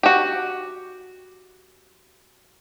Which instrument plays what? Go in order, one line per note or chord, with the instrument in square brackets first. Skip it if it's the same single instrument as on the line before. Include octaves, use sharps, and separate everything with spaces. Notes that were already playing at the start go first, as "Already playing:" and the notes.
[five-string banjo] F#4 G4